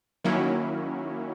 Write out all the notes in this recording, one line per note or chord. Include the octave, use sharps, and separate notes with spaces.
D#3 F#3 A#3 C#4 E4